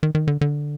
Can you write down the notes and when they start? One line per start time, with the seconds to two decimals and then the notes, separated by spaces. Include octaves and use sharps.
0.03 D#3
0.15 D#3
0.28 D3
0.41 D3